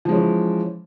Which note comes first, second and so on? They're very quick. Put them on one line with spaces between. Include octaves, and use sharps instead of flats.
F3 G#3 C#4 E3